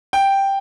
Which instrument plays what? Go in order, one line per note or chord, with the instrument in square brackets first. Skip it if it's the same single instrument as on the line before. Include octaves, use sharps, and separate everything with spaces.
[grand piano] G5